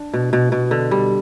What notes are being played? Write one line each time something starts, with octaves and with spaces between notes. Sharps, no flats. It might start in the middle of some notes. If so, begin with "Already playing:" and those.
Already playing: D4
B2
B2
B2
D3
G3